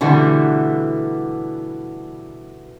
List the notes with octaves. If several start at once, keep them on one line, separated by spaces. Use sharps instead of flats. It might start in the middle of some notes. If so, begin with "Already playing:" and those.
B2 D3 E3 G3 A3 B3